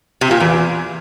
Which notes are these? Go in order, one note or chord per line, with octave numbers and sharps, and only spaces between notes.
C3
A#2
E2